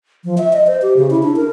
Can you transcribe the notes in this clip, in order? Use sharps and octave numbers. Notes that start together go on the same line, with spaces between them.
F3
E5
D#5
C5
G4
C#3
E4
D4
A#4